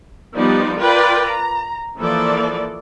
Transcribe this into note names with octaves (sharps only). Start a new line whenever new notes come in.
F3 G3 B3 D#4 D5
F4 A#4 B4 D5 G5
A#5
E3 F3 A#3 A4 D5